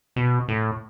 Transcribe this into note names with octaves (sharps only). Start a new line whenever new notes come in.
B2
A2